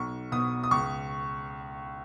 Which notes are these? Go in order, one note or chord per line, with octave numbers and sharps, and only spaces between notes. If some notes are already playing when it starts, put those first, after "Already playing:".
Already playing: B1 C#6
B2 D#6
D#6
C#2 C#6